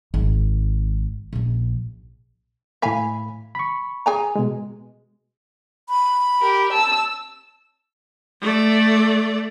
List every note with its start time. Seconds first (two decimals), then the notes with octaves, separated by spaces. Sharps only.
0.14 G#1
1.33 A#1 C#4
2.82 A2 E5 F5 G#5 B5
3.55 B5 C#6
4.06 G#4 G#5 A#5
4.36 B2 G#3
5.89 B5
6.41 G4 A#4
6.73 A5 E6
8.41 A3 D5